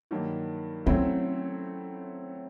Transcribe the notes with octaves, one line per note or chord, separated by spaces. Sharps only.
G2 D#3 F#3 A#3
F#3 A3 C4 C#4 E4